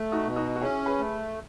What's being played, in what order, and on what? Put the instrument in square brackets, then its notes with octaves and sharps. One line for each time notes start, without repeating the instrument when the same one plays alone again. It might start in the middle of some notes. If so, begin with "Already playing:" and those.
Already playing: [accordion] A3
[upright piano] D#4 F#4
[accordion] B2
[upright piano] D#4 F#4
F#4
[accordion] C#4 [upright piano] E4 G#4
[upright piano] G#4 B4
[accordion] A3